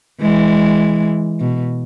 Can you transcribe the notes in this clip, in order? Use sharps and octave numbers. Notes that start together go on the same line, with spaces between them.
E3 G#3
B2